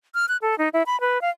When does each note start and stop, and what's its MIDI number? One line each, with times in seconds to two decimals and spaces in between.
0.14 0.26 89
0.28 0.37 90
0.42 0.57 69
0.58 0.69 63
0.73 0.83 64
0.86 0.99 83
1.01 1.21 71
1.21 1.30 77